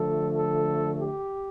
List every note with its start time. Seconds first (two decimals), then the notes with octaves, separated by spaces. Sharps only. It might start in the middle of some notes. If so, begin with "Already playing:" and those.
Already playing: D3 F3 A3 A4
0.34 A4
0.98 G4